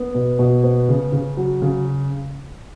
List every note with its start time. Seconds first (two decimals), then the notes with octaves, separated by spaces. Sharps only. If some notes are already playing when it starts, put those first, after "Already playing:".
Already playing: B3
0.14 B2
0.39 B2
0.63 B3
0.89 C#3
1.12 C#3
1.37 F#3
1.62 C#3